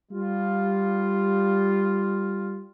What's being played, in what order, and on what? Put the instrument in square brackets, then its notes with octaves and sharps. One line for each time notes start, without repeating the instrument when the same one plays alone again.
[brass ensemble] G3 F4